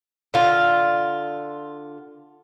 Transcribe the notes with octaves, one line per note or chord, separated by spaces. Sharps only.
D3 F4